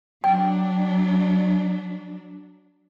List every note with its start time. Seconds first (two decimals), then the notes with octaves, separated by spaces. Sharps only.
0.24 F#3 D4 G5